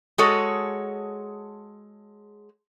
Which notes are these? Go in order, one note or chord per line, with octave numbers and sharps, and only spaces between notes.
G#3 F#4 G#4 A4 C#5